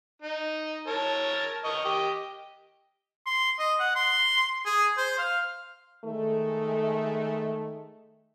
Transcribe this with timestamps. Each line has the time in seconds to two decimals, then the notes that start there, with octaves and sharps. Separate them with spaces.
0.22 D#4
0.87 A#4 C#5 A5
1.65 A#4 D#5 C#6
1.85 G4 D#5
3.26 C6
3.59 D#5
3.80 F#5
3.96 C6
4.65 G#4
4.97 C5
5.18 F5
6.05 D#3 G#3 A3